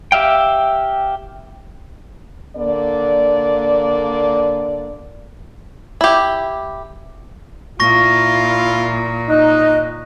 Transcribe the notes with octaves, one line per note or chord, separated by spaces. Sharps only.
G4 E5 F5 G5
D3 A#3 D5
E4 G4
A#2 E4 F4 C#6 A#6
D#4 D#5 F#6